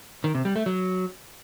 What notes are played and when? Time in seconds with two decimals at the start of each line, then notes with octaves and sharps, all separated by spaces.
0.24 D#3
0.35 C3
0.45 G3
0.56 A3
0.66 F#3